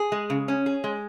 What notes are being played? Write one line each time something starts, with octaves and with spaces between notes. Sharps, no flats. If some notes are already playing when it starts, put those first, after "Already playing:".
Already playing: G#4
G#3
C#3
C#4
G#4
G#3